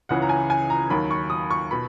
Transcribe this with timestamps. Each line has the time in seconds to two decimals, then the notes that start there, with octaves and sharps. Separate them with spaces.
0.09 C#2 C#3 E3 F#5
0.22 A#5
0.29 G#5
0.50 G#5
0.70 A#5
0.90 D#2 D#3 F#3 B5
1.11 C#6
1.30 D#6
1.51 C#6
1.71 B2 B5